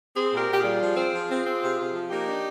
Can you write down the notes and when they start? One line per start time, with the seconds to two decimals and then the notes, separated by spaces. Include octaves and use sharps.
0.16 C4 G#4 C5
0.32 A#2
0.37 G4 A#4
0.48 A#2 G4
0.59 F4 G#4
0.65 G3
0.81 F3
0.97 C4
1.13 F3
1.30 C4
1.46 C4
1.62 C3
1.79 C3
1.94 F3
2.11 A#3 D#4 G4
2.28 D4